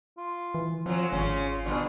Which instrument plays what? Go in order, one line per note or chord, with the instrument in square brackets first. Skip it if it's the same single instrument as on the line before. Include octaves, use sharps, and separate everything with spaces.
[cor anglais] F4
[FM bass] E3
[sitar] F2 F#3 [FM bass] F3 [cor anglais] F4
[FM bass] G#1 [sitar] C#3 C#4
[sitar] G2 B2 D3